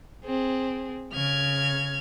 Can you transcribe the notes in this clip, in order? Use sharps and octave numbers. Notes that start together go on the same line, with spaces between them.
C4 G#4
C#3 F6 G#6